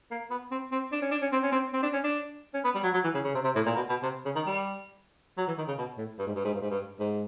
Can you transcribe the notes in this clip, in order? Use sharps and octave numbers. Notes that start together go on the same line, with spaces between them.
A#3
B3
C4
C4
D4
C#4
D4
C#4
C4
C#4
C4
C4
D4
C#4
D4
C#4
B3
G3
F#3
F#3
E3
C#3
C#3
C3
C3
A2
A#2
B2
B2
C3
C#3
D#3
G3
F#3
E3
D#3
C#3
B2
A2
G2
G#2
G2
G#2
G2
G#2
G2
G#2